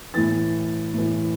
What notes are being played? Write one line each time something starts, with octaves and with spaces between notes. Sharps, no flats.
A2 E3 A6
A2 E3